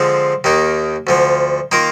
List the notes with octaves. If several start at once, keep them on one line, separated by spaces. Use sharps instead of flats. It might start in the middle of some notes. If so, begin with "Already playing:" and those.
Already playing: D3 F3 G#3 C4 F4
D#2 D#3 A#3 D#4
D2 D3 F3
D#3 A#3 F4 A#4